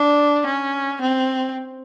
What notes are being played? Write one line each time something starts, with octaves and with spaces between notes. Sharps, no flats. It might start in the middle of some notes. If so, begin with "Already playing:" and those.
Already playing: D4
C#4
C4